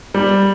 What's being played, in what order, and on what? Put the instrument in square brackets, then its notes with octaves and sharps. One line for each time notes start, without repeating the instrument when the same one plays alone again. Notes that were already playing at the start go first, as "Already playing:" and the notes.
[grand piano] G3